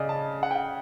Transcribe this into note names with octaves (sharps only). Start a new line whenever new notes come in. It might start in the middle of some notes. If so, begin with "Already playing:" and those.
Already playing: C#3 D5 D#5
A5
F#5
G5
F#5